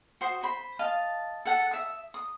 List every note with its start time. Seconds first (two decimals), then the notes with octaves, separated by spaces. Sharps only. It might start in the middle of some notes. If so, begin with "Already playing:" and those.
0.21 F#4 C5 D#6
0.43 C5 B5
0.79 D#5 F5 A5
1.46 A4 F#5 A5
1.71 E5 D#6
2.14 D#6